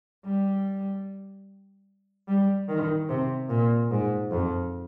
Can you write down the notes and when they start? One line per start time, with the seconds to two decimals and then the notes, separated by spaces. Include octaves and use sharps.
0.25 G3
2.28 G3
2.69 D#3
3.09 C3
3.50 A#2
3.91 G#2
4.31 F2